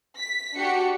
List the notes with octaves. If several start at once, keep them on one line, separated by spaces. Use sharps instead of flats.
B6
D4 F#4 G4 C#7